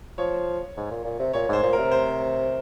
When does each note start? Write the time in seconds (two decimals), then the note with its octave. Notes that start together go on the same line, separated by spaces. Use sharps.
0.18 F3 C#5
0.77 G#2
0.91 A#2
1.05 A#2
1.19 C3
1.33 A#2 C#5
1.49 G#2 C5
1.63 A#2
1.73 C3 A#4
1.92 C5